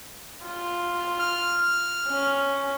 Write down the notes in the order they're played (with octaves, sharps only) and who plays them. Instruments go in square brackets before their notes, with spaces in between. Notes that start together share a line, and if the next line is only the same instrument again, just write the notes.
[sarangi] F4
[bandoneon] F6
[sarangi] C#4